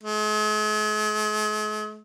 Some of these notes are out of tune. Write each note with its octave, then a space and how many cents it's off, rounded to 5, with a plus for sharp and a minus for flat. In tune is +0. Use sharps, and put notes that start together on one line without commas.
G#3 +45